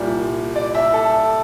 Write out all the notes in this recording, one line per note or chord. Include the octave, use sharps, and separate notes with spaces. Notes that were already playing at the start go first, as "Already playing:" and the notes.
Already playing: C2 A#2 G3 D5
D5
E5
A4